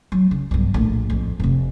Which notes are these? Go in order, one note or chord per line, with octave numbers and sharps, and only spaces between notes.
F#3
C#3
B1 G2
A#1 A2
F2
F1 C3